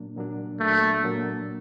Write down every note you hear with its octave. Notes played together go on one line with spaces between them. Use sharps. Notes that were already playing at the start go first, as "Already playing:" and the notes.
Already playing: A#2 F#3 A#3 D4
A#2 F#3 A#3 D4
A#2 F#3 A3 A#3 D4
A#2 F#3 A#3 D4